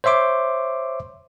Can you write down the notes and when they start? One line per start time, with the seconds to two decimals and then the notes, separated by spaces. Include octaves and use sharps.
0.04 C5 C#5 E5 C6 D6